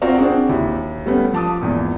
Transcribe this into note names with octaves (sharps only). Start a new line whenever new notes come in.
C4 F4 F#4 A#4 C5 D5
C4 D4 F#4 G#4
D#2 E4
G3 A3 B3 C#4
F3 A5 D6 D#6
G#1 E2 A#2